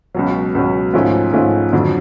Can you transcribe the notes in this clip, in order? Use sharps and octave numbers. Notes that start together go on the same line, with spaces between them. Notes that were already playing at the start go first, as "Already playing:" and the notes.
C#2 B2 F#3
C#2 B2 F#3
G#2 F3 A3 C#4
G#2 F3 A3 C#4
F2 D3 F#3